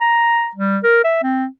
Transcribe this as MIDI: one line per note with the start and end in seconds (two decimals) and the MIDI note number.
0.01 0.49 82
0.55 0.78 55
0.83 1.01 70
1.04 1.20 76
1.23 1.46 60